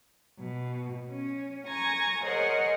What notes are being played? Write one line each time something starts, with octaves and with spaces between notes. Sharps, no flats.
B2
C#4
G#5 A#5 C#6 G#6 A#6
G#4 A#4 C5 C#5 D#5 F#5